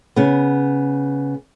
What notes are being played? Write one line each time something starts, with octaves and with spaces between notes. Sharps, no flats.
C#3 B3